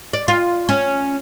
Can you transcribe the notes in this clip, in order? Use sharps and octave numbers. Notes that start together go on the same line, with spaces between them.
D5
F4
C#4